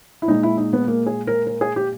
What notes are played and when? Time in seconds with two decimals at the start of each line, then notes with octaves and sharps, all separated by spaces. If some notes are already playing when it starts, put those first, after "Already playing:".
0.22 E4
0.28 A#2 G#3 D#4
0.43 E4
0.57 D#4
0.73 B3
0.88 A#3
1.06 G#4
1.27 A#4
1.47 A#4
1.61 G#4
1.76 G4